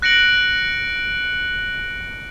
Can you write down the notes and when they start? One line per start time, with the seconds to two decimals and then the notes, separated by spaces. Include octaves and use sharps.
0.02 F#6 A#6 C#7 D7 F#7